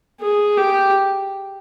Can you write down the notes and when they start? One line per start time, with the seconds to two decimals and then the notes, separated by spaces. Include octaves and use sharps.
0.20 G#4
0.57 G4